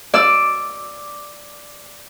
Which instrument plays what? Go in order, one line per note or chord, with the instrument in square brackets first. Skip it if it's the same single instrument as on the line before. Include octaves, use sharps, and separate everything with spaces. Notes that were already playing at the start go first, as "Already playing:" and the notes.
[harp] D5 E6